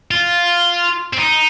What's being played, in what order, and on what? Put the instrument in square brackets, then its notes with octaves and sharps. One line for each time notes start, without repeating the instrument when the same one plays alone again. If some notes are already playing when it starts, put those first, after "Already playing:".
[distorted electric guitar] F4
C4
D#4